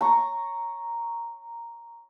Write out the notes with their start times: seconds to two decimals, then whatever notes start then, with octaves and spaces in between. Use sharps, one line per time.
0.01 A#5 C#6